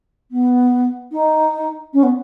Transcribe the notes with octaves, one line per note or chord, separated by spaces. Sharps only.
B3
D#4
C#4
B3